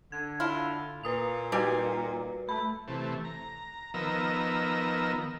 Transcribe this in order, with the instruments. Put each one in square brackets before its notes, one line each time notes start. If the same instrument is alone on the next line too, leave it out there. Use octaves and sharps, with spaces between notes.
[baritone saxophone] D3 [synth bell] G#6
[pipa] E4 F4
[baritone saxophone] A#2 [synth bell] B4 D#6 F7
[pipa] D#3 G4 G#5 [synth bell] G3 F#4 B4
[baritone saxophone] A3 [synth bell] B5
[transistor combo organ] C3 E3 A3
A#5
D#3 F3 B3 A#4 A#5 E6